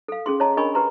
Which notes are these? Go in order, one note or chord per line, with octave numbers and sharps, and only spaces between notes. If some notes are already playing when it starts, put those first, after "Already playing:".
A4 F5
C#4 G#4 C6
C#5 D#5 A5 A#5
D4 A#4 D#5 G#5 B5 C#6
G4 B4 A#5 C6